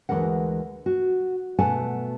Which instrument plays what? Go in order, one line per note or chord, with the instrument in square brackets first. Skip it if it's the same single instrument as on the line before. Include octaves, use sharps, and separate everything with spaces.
[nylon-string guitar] D2 G#2 E3 G#3 A#4 F#5
F#4
B2 A3 A4 F#5 G#5 A5